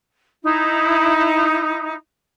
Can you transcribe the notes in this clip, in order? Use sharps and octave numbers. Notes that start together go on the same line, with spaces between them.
D#4 E4